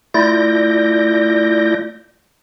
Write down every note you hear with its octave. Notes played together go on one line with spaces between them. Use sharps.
A3 E4 F4 D5 G6 A#6